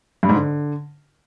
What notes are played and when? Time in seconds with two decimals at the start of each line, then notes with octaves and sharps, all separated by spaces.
0.23 G2
0.29 G#2
0.35 D3